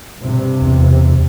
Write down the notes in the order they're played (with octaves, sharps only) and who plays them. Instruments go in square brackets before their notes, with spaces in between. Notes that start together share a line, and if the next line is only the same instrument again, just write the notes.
[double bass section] G2 C3
[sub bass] E2